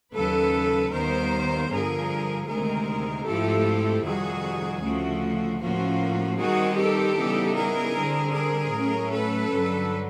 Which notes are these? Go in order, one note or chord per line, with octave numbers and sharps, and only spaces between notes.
D#2 C#3 F#3 A4 B4
D#2 D#3 G3 B3 A#4 C5
G2 D3 F3 G#4 A#4
D2 C3 D#3 G#3 C4 G#4 A#4
G#2 F3 A3 C4 E4 G4 A4
F2 C3 D#3 G3 F#4 G#4
D2 C#3 F3 A3 F#4
A2 F3 A#3 C#4 F4 F#4
D#3 G3 C4 D#4 F#4 G#4
G4 A4
C#3 E3 G3 B3 D#4
G#4 A#4
D3 G3 C4
G#4 A#4
A2 F#3 A3 C#4
A4 B4
G2 D3 F#3